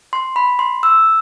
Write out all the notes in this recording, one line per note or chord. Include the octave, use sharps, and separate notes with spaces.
C6
B5
C6
E6